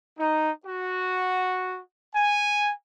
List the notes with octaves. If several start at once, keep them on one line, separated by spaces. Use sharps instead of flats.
D#4
F#4
G#5